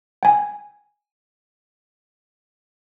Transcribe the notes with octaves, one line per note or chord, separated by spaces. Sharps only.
G5 G#5